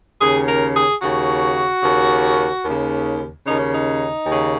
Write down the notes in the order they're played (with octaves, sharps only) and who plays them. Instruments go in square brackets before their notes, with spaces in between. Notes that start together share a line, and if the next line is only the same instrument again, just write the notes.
[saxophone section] D#2 C#3 G#4
A#4
G#4
D#2 C#3 F#4
D#2 C#3
D#2 C#3
D#2 C#3 D#4
C#4
D#4
D#2 C#3